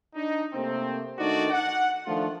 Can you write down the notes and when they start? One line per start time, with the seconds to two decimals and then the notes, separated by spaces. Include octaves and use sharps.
0.15 D4 D#4
0.54 C3 A3 A#3 C4
1.19 D#3 A3 D4 D#4 F#4 D5
1.51 F#5
2.06 D#3 F3 A3 D4 F4